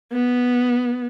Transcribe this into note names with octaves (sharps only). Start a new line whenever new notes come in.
B3